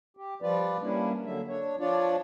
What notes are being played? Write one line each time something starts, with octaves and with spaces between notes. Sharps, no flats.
G4
F3 G3 F4 B4 D5
G3 A#3 C#4 D4 E4
D3 F#3 A#3 E5
D4 C#5
F3 D4 F4 C#5 D5